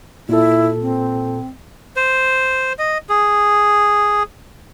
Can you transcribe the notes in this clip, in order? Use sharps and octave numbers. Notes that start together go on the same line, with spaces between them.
A#2 E4 A4
C4
C5
D#5
G#4